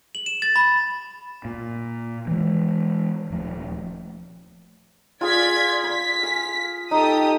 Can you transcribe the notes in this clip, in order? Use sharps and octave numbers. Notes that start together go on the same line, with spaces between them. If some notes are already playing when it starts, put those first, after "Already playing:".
F#7
E7
A6
B5
A#2
E3 G#3
D#1 F3 A3
F4 G#4 D5 F5 G#6 B6
C6 B6
F5 G#5
D#4 G4 A4 D#6